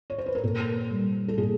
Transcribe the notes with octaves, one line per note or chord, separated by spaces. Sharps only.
C#5
C5
B4
A#4
A#2 A4
G3
A4
A#2 G#4